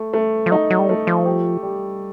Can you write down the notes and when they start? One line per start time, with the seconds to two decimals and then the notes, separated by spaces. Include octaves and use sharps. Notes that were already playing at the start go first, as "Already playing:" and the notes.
Already playing: A3
0.13 A3
0.46 F3
0.51 F#3 D#4
0.70 F#3
0.79 G3
0.89 F#3 A3
1.07 F3
1.25 G4
1.63 G3